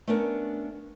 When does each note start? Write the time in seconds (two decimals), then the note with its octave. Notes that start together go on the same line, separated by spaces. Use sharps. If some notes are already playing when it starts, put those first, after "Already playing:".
0.07 A3 B3 C#4 D4 A#4